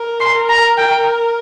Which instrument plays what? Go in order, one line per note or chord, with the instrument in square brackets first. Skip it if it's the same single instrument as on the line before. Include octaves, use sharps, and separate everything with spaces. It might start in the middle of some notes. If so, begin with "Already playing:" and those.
Already playing: [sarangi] A#4
[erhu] C6
[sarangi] A#4
[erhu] A#5
G5